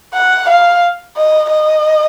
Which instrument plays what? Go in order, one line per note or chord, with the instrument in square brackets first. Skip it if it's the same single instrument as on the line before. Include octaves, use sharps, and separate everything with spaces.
[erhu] F#5
F5
D#5
D#5